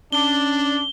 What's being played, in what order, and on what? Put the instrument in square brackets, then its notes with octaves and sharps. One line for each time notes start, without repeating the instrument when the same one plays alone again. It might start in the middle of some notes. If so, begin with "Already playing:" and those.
[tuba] C#4 [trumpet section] D4 [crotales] G7